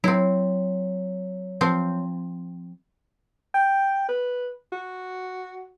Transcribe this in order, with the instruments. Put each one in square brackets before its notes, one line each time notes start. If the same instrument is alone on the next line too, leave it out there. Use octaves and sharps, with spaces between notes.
[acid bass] F#3 [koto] C4 E4
[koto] F3 C4
[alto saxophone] G5
B4
F#4